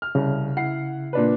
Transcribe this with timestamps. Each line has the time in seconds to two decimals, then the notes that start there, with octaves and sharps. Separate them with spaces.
0.02 F6
0.15 C2 C#3
0.57 E4 F#5 C7
1.13 A#2 D4 B4